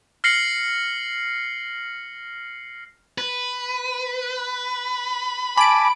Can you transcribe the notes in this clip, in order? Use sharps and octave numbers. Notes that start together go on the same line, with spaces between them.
F6 A#6 C7 C#7 F#7
B4
G#5 A5 B5 D6 D7